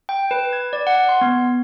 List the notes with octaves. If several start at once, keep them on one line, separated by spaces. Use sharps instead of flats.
G5
B4
G#6
D5
F#5
C6
B3